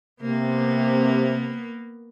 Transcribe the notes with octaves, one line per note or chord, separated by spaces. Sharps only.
C3 A#3 B3